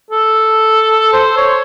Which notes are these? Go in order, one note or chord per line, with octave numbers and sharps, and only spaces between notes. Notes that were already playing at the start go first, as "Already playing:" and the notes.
A4
C5
C#5